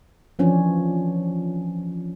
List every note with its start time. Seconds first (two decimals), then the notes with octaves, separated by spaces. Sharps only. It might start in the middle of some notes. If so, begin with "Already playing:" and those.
0.39 E3 F3 C#4 D4